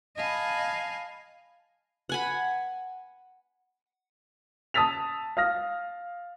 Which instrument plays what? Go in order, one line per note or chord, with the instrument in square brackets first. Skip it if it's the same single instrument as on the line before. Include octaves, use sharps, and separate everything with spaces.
[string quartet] D#5 F5 G#5 A5 B5
[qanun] F#5 G#5 B5
[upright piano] A5 D#6 E6 A6 B6 F7
F5 D#6 F6 A#6